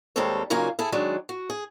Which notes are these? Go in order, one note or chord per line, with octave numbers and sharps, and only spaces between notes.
D#2 G3 G#3 C4 A4 C#5
C#3 F#3 A#3 D#4 F4 G#5
E4 G#4 A4
D#3 F#3 G#3 D4
F#4
G#4